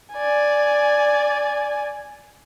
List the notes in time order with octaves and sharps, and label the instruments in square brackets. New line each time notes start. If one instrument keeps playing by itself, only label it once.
[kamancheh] D5 G#5